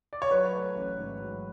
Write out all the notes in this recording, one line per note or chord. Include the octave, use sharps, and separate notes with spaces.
D5
C#5
F#3 B4
A3
A1
G#2
F#3